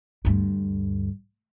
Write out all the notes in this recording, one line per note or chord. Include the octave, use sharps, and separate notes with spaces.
D2 G2